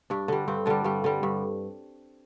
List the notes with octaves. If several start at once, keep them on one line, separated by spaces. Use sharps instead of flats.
G2 D4
D3 G3
G2 C4
D3 G3 D4
G2 G3
D3 G3
G2